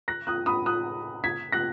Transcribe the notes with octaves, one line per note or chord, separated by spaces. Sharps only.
F#6 A#6
D#6 F#6
B5 D#6
D#6 F#6
G#6 B6
F#6 A#6